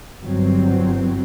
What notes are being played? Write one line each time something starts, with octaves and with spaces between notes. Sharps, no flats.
G1 G2 F#3 C4